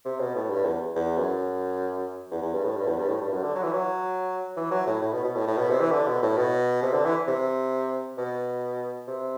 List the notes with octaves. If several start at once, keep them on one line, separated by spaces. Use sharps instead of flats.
C3
B2
A2
G2
E2
E2
F#2
E2
E2
G2
A2
G2
E2
G2
A2
G2
F#2
D3
F#3
E3
F#3
E3
F#3
A2
A2
B2
B2
A2
A2
B2
C3
E3
D3
B2
A2
B2
C3
D3
E3
C3
B2
C3